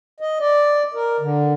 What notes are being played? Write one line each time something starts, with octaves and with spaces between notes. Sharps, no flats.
D#5
D5
A#4
D3